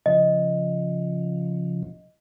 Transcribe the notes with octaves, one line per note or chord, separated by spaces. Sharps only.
C#3 F3 D#5